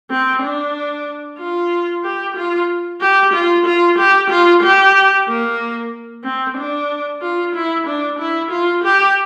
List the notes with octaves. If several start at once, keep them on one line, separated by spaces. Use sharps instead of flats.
C4
D4
F4
G4
F4
G4
F4
F4
G4
F4
G4
A#3
C4
D4
F4
E4
D4
E4
F4
G4